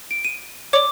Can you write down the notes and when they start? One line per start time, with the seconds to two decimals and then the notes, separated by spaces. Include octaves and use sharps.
0.11 D7
0.25 D#7
0.73 C#5 D5 D6